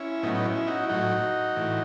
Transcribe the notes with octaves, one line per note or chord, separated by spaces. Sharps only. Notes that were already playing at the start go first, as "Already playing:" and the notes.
Already playing: C#4 E4
A2 F#3 B3 D#4
D#4
C#4 E4
D#4 F#4
E4
A2 F#3 D#4 F#4
A2 E3